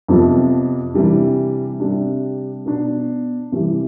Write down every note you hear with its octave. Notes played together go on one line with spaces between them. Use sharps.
F2 C3 F3 B3
C3 E3 G3 D4
C3 G3 D4
B2 B3 D4
C3 E3 G3